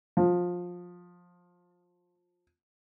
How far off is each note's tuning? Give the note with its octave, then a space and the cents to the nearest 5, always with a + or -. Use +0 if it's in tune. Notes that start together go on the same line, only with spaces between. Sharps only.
F3 +20